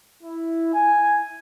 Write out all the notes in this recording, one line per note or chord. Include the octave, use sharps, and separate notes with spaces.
E4
G#5